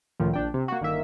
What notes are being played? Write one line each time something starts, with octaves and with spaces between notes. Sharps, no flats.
C#2 A2 D#3 F3
A#1 D4 G5
C3
A#3 F#4
G1 D#3 A#3 E5